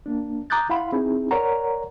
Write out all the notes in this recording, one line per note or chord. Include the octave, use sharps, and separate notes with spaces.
A#3 D4
A#5 D6 D#6 F#6 G6 A6
E4 F5 F#5 B5 C6
C4 D#4 E4 G#4
A#4 C#5 D5 F#5 A#5